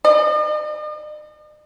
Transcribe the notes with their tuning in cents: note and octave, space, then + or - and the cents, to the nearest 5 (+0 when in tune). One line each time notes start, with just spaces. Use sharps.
D#5 -45